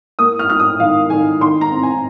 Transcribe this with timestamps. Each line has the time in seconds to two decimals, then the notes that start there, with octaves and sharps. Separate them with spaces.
0.19 A#3 D#6
0.39 F6
0.49 F4 F6
0.59 D#6
0.80 D#3 F5
1.10 D#3 G#5
1.41 D#3 C6
1.61 A#5
1.72 C4
1.83 G#5